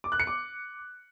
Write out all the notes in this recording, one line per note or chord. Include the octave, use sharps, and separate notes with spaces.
D6
F#6
C#7
D6